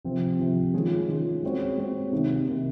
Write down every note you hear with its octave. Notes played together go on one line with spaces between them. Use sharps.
C3 F3 C4
C3 F3 C4
D#3 G#3 C#4 F4 G#4
D#3 G#3 C#4 F4 G#4
G#3 C4 F#4 C#5
G#3 C4 F#4 C#5
C3 D#3 A#3 D#4
C3 D#3 A#3 D#4